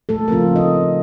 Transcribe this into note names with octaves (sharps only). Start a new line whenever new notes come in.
A3 A4
C#3 F3 A3 A#3 C4 F4 A#4
D#4 D#5